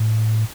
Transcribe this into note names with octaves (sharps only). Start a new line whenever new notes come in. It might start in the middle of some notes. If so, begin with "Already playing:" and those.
Already playing: A2